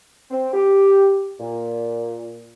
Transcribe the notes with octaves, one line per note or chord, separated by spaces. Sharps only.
C4
G4
A#2